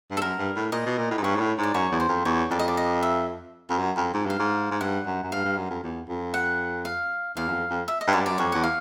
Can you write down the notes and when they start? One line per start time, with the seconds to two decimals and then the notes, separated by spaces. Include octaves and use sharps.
0.11 G2
0.17 A4
0.22 F#2 A#4
0.39 G2
0.56 A2
0.72 A#2 D#5
0.86 B2
0.98 A#2
1.11 A2
1.18 G#2
1.23 G2 C#5
1.36 G#2
1.41 A2
1.58 G#2
1.63 D5
1.74 F#2 C#5
1.92 E2
2.00 C5
2.09 F2
2.25 E2 C#5
2.51 F2 D5
2.59 D#5
2.68 D5
2.77 D#5
3.03 E5
3.70 F2
3.79 F#2
3.97 F2
4.14 G#2
4.26 G2 F5
4.39 G#2
4.71 G#2
4.81 G2 F#5
5.06 F#2
5.23 F#2
5.32 G2 F5
5.45 G2
5.57 F#2
5.70 F2
5.84 E2
6.08 F2
6.34 F#5
6.85 F5
7.36 E2 F5
7.48 F#2
7.53 F2
7.70 F2
7.88 E5
8.01 D#5
8.07 G2
8.13 F#2 D5
8.21 G2
8.26 F#2 D5
8.38 F2 C#5
8.52 E2 F#5
8.63 F5